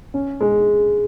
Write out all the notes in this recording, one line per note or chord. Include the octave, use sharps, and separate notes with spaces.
C#4
G#3